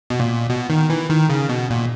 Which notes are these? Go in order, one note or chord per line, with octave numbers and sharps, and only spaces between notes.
B2
A#2
B2
D#3
E3
D#3
C#3
B2
A#2